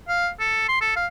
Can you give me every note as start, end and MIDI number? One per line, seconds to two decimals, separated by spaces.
0.09 0.29 77
0.40 0.68 69
0.69 0.79 84
0.81 0.92 69
0.96 1.07 77